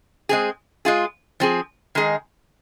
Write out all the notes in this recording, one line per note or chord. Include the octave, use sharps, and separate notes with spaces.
G#3 C4 G#4
G#3 F4 G#4
F3 C4 G#4
D#3 G#3 D#4 G#4